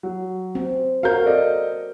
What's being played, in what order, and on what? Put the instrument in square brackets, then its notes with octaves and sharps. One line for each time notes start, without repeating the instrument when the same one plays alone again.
[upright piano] F#3
[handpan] C4
[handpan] F#4 A#4 C#5 [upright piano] F5 G6
[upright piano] A4 D5 D#5